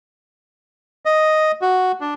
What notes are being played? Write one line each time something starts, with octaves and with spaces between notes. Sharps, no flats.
D#5
F#4
D4